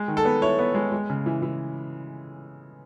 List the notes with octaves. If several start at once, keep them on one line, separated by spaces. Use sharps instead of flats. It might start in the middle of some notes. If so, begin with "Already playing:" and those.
Already playing: G#3
D#3
A4
B3
E4 C#5
B3
G#3
G#3
C#3
E3
E3